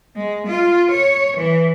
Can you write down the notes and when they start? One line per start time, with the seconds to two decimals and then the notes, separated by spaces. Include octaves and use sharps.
0.16 G#3
0.47 F4
0.91 C#5
1.37 E3